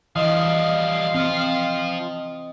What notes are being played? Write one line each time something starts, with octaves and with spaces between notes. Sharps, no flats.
E3 F3 G3 D#5 F5 D#6
F3 C4 F4